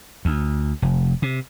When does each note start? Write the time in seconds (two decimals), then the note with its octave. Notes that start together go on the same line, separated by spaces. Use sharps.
0.25 D2
0.82 F1
1.22 C3